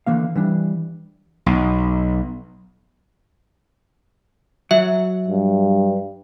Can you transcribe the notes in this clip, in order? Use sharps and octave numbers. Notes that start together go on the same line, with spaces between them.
D3 E3 A#3 F5
E3 G3 D4
B1
F#3 E5
G2